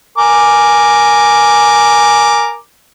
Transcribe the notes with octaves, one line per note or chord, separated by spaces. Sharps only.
A#4 G#5 D6